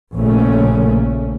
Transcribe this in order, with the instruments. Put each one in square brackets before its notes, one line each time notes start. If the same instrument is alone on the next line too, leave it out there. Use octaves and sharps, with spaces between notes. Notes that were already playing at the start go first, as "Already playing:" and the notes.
[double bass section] A#1 A#2 C#3 A3 C#4